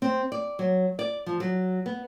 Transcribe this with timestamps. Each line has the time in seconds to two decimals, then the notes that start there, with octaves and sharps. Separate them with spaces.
0.02 C4
0.32 D5
0.59 F#3
0.99 D5
1.26 F3
1.40 F#3
1.86 B3